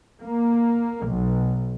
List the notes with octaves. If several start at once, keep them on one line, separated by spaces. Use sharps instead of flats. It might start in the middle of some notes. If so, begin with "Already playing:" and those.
A#3
B1